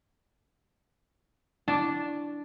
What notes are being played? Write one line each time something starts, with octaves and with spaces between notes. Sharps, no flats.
D4